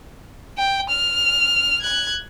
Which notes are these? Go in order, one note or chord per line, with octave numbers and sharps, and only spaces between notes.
G5
F6
F#6 G#6